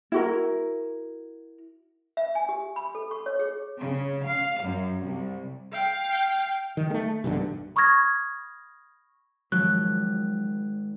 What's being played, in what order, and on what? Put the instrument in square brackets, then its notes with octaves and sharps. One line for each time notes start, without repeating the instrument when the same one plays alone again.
[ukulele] E4 F#4 A#4
[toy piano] E5
G#5
G4
B5
A4
C#6
C#5
G#4
[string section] C#3
F5
F#2
C2
[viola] F5 G5
[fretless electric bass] D#3
G#3 A3
B1 E2 G2 D3
[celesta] B5 C#6 D#6 F6 G#6 A#6
[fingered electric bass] G#1 G#2 D#3 [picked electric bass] F3 F#3 [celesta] F#6